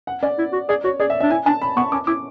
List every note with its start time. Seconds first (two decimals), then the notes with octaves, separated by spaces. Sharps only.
0.07 F#5
0.22 C#4 D5
0.38 E4
0.53 F#4
0.69 G#4 D5
0.84 F#4 C#5
1.00 G#4 D5
1.10 E5
1.20 D4 E5
1.30 E4 G#5
1.46 D4 A5
1.62 B5
1.76 B3 C#6
1.92 C#4 D6
2.07 E4 D6